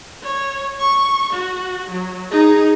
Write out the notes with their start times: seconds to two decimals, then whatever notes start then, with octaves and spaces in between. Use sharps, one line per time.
0.23 C#5
0.79 C#6
1.33 F#4
1.90 F#3
2.30 D#4 G#4